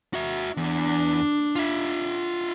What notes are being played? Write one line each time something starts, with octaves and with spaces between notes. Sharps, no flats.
F#4 E5
E2 D4
F4 E5